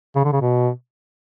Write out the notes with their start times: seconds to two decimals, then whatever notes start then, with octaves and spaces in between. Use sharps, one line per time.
0.15 C#3
0.24 D3
0.33 C#3
0.41 B2